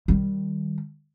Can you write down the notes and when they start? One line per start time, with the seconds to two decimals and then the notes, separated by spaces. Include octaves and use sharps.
0.08 D#3 G3